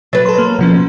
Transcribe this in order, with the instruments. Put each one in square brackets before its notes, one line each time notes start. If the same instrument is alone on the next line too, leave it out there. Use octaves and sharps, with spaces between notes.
[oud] F#3 B4 [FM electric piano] A6
[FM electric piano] A4 C6
A#3
B2 F3 C#4